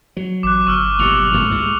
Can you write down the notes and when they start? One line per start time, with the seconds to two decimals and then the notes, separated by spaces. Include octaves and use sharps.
0.17 F#3
0.43 A1 D6 F#6
0.67 G1 C#6 E6 F6
0.99 B1 A#2 G3 C#7 F7 F#7
1.33 D2 G#2 B3 C#6
1.51 C#2 A2 G3 G#3